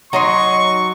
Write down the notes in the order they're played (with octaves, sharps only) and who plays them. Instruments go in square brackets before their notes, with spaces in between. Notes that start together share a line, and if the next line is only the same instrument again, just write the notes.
[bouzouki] F#3 [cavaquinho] D#4 D#5 C6 [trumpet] C#6